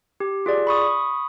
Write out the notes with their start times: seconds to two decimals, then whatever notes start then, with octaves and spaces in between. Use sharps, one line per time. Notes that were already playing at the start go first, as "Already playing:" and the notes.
0.20 G4
0.46 F4 G#4 D5
0.67 B5 C#6 D#6